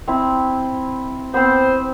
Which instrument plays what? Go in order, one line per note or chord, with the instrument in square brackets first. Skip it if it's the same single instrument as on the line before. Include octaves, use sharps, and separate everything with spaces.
[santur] C4 E4
[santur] B3 C4 [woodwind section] C5